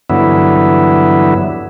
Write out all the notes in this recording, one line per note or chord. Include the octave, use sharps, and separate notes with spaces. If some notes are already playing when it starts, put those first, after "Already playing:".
G2 D3 E3 F#3 B3 E4